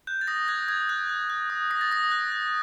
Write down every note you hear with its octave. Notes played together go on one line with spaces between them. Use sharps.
F#6 G6
A6
D#6 A#6
F#6 G#6
D#6 G#6
F#6
F#6
F#6
D#6
D#6 A#6
A6
D#6 A#6
F#6
F#6